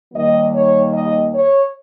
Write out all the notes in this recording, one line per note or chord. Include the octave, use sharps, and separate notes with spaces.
D#2 D#3 G3 A#3 D#5
C#5
D#5
C#5